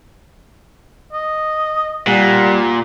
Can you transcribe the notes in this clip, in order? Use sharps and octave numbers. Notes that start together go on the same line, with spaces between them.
D#5
A#2 G3 F#5